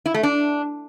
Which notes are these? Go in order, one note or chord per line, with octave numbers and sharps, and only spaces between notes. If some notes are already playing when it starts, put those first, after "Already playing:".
E4
A3
D4